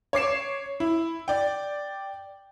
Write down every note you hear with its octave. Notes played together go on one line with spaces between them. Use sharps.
C#5 D6 C7 E7
E4
D5 G5